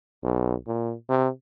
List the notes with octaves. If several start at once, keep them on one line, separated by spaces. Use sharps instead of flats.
B1
A#2
C3